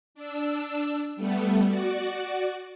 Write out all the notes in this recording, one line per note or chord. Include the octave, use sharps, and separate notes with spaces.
D4 E6
G3 A3 B3
F#4 D5